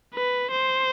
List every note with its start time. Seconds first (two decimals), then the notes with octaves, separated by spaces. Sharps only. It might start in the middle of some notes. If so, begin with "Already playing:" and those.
0.14 B4
0.51 C5